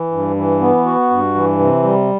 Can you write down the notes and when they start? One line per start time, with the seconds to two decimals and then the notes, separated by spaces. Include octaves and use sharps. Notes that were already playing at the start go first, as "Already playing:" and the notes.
Already playing: E3
0.12 G2
0.36 E3
0.60 B3
0.86 F#4
1.10 G2
1.35 E3
1.59 C3
1.83 G3